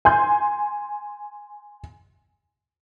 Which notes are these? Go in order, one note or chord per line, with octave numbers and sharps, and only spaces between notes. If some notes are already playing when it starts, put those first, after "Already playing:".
G#5 C6 G6